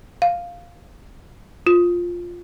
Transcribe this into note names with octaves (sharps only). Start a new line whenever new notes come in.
F5
F4